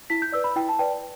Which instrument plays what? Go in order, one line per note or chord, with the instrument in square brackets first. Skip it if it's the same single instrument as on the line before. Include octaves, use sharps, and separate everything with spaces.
[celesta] E4 B6
G6
B4 D5 E6
B5
E4 G5
A5
B4 D5 G5